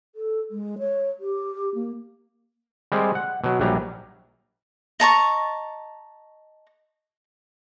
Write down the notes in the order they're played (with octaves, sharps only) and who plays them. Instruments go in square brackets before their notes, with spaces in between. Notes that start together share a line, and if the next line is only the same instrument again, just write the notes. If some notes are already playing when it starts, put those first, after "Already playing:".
[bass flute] A4
G#3
C#5
G4
A#3
[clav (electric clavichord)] G3 G#3 C4
F#5
B2 F#3
A#1 F#3 G3 A#5
[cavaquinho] D#5 A5 A#5 C#6